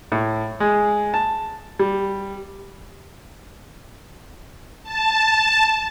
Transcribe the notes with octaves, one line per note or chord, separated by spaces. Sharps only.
A2
G#3
A5
G3
A5